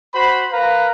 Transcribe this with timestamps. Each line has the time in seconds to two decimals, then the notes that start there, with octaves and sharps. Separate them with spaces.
0.14 F#4 C5 B5
0.52 A#4 B4 F5 A#5